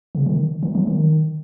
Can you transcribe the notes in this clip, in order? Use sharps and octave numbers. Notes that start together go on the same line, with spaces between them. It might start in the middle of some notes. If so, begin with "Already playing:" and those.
C#3
D#3
D#3
F3
D#3